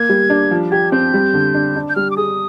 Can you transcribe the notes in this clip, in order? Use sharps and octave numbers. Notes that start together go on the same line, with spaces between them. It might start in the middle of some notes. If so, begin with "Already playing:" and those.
Already playing: A#3 G#6
G3
D4
F3
G4 G#6
C4 G6
G3
D3
D4
D4
G6
G3 F6
D6
G#4 D#6